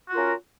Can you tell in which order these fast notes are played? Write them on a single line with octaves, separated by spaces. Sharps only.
F#4 F4 A#4 C#4